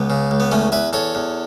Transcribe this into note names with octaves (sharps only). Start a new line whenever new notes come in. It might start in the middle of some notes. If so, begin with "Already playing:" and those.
Already playing: C#2 B3
C#3
C#2
B3
E2 A3 C#4
E2 B4 E5
E2 A4 C#5
E2